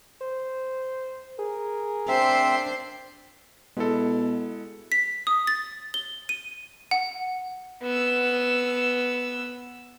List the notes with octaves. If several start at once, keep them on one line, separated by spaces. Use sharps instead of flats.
C5
G#4 A#4
C4 D4 C5 E5
B2 G#3 E4 A4
B6
D#6
A6
G7
D#7
F#5
B3 E6